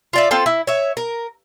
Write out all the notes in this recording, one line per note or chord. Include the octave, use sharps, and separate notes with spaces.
F4 D5 E5
C4 F4 A4
E4
C#5 E5
A#4